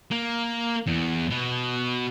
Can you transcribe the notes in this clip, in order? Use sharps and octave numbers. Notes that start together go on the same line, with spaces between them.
A#3
E2
B2